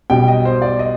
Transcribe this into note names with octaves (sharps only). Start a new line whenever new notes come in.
B1 B2 G3 G5
D#5
C5
D5
D#5